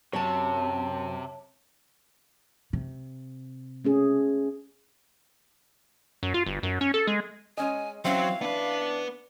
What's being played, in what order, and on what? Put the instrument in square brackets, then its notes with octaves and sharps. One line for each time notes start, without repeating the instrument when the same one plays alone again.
[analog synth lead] F#2 [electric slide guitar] C3 [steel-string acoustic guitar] C#5 A5
[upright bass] C3
[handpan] A3 C#4 G#4
[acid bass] F#2
F4
G1
F#2
C#4
A4
G#3
[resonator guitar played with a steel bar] G#3 C#4 D#5 [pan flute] G#5
[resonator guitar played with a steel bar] E3 C#4 E5 [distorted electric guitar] F#3 [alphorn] C4 [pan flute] F5
[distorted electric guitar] B3 B4 [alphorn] D4